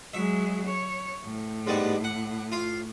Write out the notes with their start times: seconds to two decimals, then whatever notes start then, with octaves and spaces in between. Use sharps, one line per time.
0.14 F#3 G#3 E5
0.67 C#5
1.25 A2
1.67 G#2 G3 B3
2.04 F#5
2.52 F4 F5